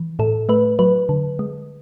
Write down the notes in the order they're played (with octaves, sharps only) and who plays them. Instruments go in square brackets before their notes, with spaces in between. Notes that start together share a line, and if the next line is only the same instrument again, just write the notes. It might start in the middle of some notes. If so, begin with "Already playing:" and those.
Already playing: [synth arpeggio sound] E3
A2 A4
A3 B4
F#3 B4
D3
G#3